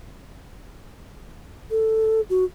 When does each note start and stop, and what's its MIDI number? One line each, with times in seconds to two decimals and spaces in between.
1.71 2.21 69
2.30 2.45 66